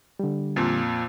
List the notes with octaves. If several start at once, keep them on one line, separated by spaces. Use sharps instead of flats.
D3 G3
F2 A#2